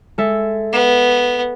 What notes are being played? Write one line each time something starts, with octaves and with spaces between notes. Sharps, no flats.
G#3 A4 E5
B3